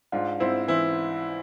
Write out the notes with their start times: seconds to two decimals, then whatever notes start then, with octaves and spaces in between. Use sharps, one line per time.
0.12 G#2 D4 F4
0.40 G#2 C4 E4
0.68 E3 C4 E4